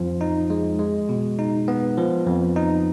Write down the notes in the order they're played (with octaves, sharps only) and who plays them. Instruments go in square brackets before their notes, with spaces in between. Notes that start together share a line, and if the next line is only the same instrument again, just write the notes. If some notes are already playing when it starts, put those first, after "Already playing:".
Already playing: [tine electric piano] F2 F3
D#4
G#3
G#3
B2
D#4
B3
F3
F2
D#4